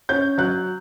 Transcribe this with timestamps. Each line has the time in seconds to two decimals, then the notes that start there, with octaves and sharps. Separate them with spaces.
0.09 C#4 G6
0.38 F#3 F#6